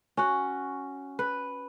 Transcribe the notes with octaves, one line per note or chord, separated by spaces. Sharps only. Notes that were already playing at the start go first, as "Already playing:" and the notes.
C#4 F#4
B4